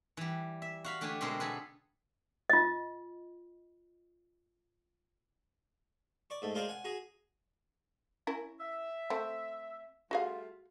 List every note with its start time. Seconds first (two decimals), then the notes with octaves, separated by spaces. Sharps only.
0.17 E3 G3
0.62 E5
0.84 F#4 F5 B5
1.01 D3 A3 D4 G4 G#5
1.21 B2 D3 G#3 C4 A#4
1.40 B3 G#4 A4 B4
2.50 F4 D#5
6.30 D5 C#6
6.42 G#2 A3
6.55 G#3 F4 G#4 A#4 C5 D5
6.68 F#5 G#5
6.85 F#4 G#4 A#5
8.27 C#4 E4 A#4
8.60 E5
9.10 A3 C4
10.11 G3 A3 F4 F#4 G#4 F5